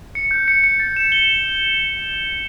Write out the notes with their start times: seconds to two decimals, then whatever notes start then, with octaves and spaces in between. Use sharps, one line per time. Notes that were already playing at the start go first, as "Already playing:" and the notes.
0.15 C#7
0.31 G6
0.48 C#7
0.64 C#7
0.80 A6
0.96 E7
1.12 G7